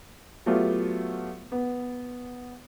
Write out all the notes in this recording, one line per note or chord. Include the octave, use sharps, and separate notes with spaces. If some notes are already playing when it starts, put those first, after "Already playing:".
F#3 A3 B3 F4 G4
B3